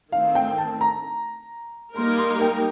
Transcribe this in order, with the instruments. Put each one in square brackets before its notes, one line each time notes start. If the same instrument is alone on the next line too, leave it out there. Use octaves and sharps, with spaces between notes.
[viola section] D#3 A3 C4 [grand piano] F5
[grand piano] G5
A5
A#5
[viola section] G3 A#3 D#4 A#4 [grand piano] C6
[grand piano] C6
G5